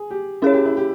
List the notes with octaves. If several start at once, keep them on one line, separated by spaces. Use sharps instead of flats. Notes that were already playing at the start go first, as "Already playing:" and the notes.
Already playing: G#4
G4
C#4 E4 G#4 C#5
G4
E4
G4